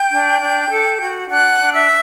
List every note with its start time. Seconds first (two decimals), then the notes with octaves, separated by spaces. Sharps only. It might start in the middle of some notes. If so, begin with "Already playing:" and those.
Already playing: G5 G6
0.10 D4
0.40 D4
0.70 A4
1.00 F#4
1.29 D4 F#5 F#6
1.59 D4
1.73 E5 E6